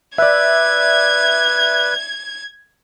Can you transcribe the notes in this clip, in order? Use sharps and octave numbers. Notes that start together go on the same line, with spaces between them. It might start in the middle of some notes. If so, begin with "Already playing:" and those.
B4 D5 E5 G#6